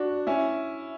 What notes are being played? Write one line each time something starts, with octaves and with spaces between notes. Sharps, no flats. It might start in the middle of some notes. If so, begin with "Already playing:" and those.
Already playing: D4 F#4
C#4 E4